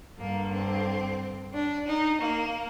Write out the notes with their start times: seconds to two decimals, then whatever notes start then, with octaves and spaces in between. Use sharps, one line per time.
0.20 G2 D3 A#3
0.54 C4
1.54 D4
1.87 D#4
2.21 A#3